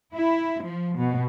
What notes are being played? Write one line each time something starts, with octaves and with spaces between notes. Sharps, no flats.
E4
F3
B2